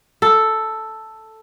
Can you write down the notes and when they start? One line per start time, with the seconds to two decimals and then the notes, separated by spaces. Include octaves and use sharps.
0.22 A4